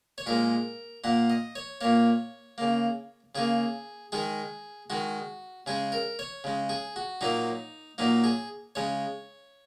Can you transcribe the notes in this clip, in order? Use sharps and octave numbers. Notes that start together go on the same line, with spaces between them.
C#5
A#2 G#3 A#4
A#2 A#3 F#5
D#5
C#5
A#2 A#3 C#5
C#3 A#3
C#3 A#3 G#4
D#3 G#3 G#4
D#3 G#3 F#4
C#3 G#3 G#4
A#4
C#5
C#3 G#3
G#4
F#4
A#2 F#3 A#3 D#4
A#2 F#3 A#3 D#4
G#4
C#3 G#3 C#5